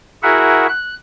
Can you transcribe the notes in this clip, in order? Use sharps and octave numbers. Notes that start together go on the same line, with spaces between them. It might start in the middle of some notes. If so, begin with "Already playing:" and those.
E4 F#4 G#4 A#4 E5 F#5
F#6